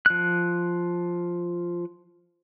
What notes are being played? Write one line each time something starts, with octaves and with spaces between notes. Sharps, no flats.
F3 F#6